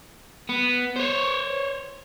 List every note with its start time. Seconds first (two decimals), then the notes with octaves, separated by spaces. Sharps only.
0.49 B3
0.96 C5 C#5